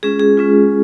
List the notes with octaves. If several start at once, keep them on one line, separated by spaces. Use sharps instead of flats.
G#3 C#4 F4 G#4
G#4
G#3 C#4 F4